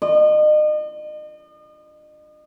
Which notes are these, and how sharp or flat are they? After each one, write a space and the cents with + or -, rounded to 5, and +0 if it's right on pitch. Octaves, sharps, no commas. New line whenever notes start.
D#5 -40